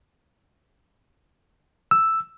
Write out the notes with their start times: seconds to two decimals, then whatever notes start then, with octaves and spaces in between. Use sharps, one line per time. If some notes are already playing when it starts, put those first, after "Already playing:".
1.91 E6